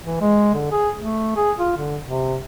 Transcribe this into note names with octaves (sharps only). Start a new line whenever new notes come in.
E3
G#3
D3
G#4
A3
G#4
F4
D3
C3